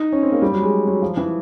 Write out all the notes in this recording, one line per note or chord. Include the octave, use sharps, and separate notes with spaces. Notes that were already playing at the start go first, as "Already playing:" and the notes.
Already playing: D#4
C#4
C4
A#3
G3
F#3
G#3
F#3
F3
E3